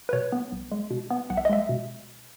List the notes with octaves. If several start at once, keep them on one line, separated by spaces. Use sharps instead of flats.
B4
B2 C#5
B3
B1
G#3
B2
B3
B1 F#5
E5
D#5
G#3 E5
B2